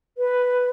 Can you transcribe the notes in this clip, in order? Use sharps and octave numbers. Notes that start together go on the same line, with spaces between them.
B4